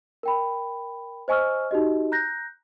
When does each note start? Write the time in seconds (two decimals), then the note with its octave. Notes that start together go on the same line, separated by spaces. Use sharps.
0.23 A#4 G5 B5
1.28 C5 D#5 G#5 C#6 E6 F6
1.71 D#4 F#4 G4 D#5
2.12 A#5 F#6 G6 A#6